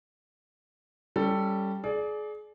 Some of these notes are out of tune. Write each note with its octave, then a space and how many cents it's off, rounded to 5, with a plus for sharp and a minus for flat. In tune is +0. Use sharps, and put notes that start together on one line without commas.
G3 +0 C#4 +0 A4 +10
G#4 +35 D5 +0